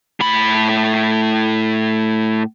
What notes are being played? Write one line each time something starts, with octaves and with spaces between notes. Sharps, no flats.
A2 B5